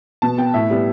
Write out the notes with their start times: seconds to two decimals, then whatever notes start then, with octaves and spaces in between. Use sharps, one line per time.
0.22 B2 A5
0.38 B3 G5
0.54 A2 E5
0.70 G3 B3